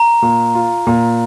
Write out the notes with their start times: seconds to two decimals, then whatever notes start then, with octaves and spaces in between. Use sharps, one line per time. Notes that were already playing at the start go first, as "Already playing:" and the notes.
Already playing: A#5
0.22 A#2
0.54 F4
0.87 A#2